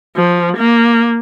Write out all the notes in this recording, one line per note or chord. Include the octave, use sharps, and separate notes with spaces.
F3
A#3